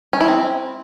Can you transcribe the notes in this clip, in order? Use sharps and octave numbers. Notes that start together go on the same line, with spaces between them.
C#4
E4
C4